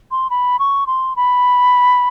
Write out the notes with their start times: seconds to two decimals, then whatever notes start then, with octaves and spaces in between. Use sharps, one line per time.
0.11 C6
0.30 B5
0.59 C#6
0.87 C6
1.16 B5